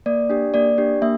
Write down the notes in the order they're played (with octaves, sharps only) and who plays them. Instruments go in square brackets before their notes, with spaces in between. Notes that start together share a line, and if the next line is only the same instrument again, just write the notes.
[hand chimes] A#3 D5
D4 G4
A#3 D5
D4 G4
A#3 E5